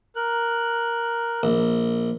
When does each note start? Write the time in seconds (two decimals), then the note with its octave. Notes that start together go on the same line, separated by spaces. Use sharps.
0.16 A#4 F#6
1.43 A#1